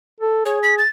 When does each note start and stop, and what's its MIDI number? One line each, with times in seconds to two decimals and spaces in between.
0.20 0.44 69
0.45 0.81 68
0.45 0.59 73
0.63 0.75 95
0.78 0.88 93